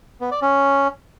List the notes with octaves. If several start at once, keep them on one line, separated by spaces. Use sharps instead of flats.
B3
D5
C#4